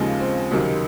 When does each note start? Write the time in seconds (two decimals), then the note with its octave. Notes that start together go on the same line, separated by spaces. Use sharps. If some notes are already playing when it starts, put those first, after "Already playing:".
Already playing: D#2 C#3 F3 G#3
0.20 C4
0.51 C#2 C3 D#3 F#3